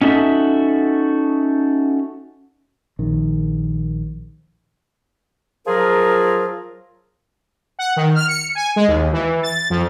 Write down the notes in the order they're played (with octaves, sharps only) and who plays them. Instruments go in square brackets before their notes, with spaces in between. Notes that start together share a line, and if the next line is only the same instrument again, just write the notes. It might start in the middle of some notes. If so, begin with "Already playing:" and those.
[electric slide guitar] C#4 D#4 F#4 A4 E5
[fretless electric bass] A#1 D#3
[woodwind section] F3 F#3 F4 G#4 A#4
[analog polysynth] F#5
D#3
F6
C#7
G#5
G#3
D#2
E3
A6
F2